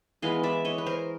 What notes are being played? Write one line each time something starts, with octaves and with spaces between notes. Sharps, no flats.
E3 G#3 B3 D#5 F5
D5 E5
C#5 D#5
B4
A#4 C5